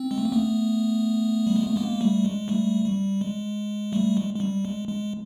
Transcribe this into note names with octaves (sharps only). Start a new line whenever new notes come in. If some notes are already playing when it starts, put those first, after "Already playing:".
Already playing: C4
G#3
A3
A#3
A3 B3
G3
G#3
A3
G#3 A#3
G3 A3
G#3
G3 A3
G3
G#3
G3 A3
G#3
G#3
G3
G#3
G#3